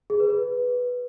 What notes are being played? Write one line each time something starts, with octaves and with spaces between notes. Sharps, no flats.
G#4
B4
B4